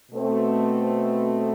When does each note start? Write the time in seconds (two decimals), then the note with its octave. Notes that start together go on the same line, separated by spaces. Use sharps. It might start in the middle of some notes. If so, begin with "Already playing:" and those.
0.12 B2 A3 C4